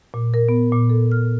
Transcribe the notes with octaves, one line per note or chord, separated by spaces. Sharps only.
A#2
A#4
B3
A#2
A4
F6